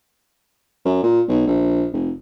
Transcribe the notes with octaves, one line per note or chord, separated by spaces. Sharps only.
F#2
A#2
B1
A#1
F1